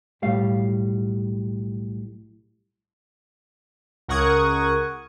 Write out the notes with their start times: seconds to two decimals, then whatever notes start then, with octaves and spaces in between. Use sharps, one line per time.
0.22 B1 A2 G3 F5
4.08 C#2 A#4 F#5 C#6 D#6 G#6